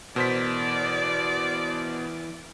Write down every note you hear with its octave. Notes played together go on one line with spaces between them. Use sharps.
B2 E3 A#4 C5 D5 B6